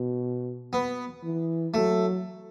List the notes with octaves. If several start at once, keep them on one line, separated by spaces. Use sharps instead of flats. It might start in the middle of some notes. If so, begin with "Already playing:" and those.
Already playing: B2
B3
E3
F#3 A3